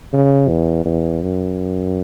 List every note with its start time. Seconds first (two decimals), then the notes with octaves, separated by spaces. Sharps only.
0.13 C#3
0.49 E2
0.86 E2
1.22 F#2